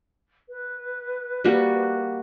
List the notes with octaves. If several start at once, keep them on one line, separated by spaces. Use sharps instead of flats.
B4
G3 A#3 F#4